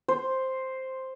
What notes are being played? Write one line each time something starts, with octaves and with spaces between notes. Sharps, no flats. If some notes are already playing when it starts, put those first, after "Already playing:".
C5